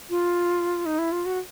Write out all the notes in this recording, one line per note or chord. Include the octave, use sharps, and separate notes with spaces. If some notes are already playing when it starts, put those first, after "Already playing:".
F4
D#4
E4
F4
F#4